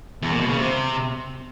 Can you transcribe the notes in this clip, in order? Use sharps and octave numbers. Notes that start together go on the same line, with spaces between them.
E2
A#2
B2
C#3
C3